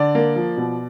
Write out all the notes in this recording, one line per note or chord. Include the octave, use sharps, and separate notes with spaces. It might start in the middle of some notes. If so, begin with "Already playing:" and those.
Already playing: D3 D5
A#3
F3
B2